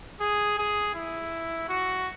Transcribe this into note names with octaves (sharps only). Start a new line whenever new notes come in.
G#4
G#4
E4
F#4